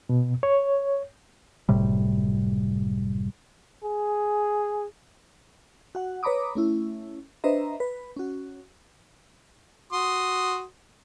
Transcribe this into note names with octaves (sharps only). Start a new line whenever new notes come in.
B2
C#5
F#1 A2 C3 G3
G#4
F#4 F#5
B4 C#5 A#5 B5 D6 D#6
A3 C#4 E4
D4 B4 C5 D#5 E5 A#5
B4
C#4 F#4
F#4 C6 D#6